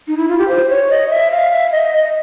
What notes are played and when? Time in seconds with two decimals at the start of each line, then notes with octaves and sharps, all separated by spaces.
0.08 D#4
0.17 E4
0.29 F4
0.38 G4
0.48 C5
0.69 C#5
0.90 D#5
1.10 E5
1.31 F5
1.52 E5
1.72 D#5
1.92 D#5